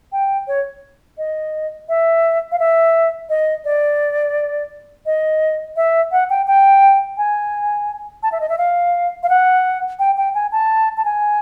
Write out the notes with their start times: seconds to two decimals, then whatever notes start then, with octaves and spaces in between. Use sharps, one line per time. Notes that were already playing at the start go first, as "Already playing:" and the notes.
0.12 G5
0.47 C#5
1.18 D#5
1.89 E5
2.52 F5
2.59 E5
3.29 D#5
3.65 D5
5.06 D#5
5.76 E5
6.12 F#5
6.30 G5
6.47 G5
7.17 G#5
8.23 A5
8.32 E5
8.40 D#5
8.49 E5
8.58 F5
9.23 F5
9.29 F#5
9.99 G5
10.17 G5
10.34 G#5
10.52 A5
10.97 A5
11.05 G#5